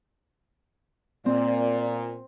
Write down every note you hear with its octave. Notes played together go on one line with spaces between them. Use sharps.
A#2 C4 D5